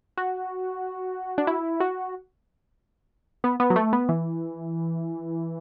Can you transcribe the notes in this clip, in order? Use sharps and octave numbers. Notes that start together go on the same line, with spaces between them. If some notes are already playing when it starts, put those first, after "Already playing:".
F#4
D4
E4
F#4
B3
B3
F#3
A3
B3
E3